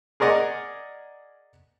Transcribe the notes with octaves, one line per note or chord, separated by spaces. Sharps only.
G#4 A#4 D5 D#5 F#5